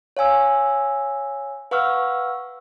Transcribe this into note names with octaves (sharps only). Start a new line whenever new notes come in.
C#5 F5 G#5 E6
B4 F5 F#5 C#6 E6 F6